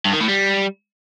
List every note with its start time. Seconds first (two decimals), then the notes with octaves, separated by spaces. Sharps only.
0.05 G2
0.13 D#3
0.20 A2
0.28 G3